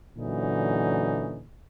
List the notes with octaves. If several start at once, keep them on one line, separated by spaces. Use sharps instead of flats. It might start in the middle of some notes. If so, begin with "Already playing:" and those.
A#2 D3 E3 F#3 C#4 D#4